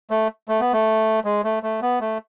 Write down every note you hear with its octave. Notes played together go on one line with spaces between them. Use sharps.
A3
A3
B3
A3
G#3
A3
A3
B3
A3